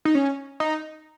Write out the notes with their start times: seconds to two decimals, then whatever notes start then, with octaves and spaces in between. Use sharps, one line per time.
0.05 D#4
0.15 C#4
0.60 D#4